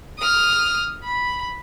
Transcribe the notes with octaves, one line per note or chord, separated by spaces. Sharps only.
D#6 F6
B5